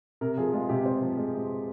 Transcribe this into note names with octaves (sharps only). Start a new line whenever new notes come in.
C3 A#4
F3 G#4
G#3 F4
C3 G4
C3 C5
F3
G#3
C3